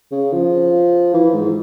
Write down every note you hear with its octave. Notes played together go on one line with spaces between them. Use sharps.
C#3
F3
E3
G#2